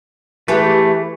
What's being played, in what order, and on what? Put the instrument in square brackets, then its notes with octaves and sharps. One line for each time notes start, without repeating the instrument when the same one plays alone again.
[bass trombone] E3 [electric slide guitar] A3 [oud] G4 G#4 B4